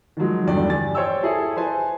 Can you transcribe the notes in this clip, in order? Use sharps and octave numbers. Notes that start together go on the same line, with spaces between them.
D#3 F3 F#3 G#3
E2 G2 D3 D5 G5
G4 G#5 A6
C5 C#5 G5 E6
E4 G#4 A4 E5
B4 C5 G#5 A5